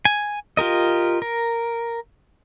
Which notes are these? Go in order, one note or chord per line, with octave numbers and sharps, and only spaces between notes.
G#5
F4 G4 A#4 D#5
A#4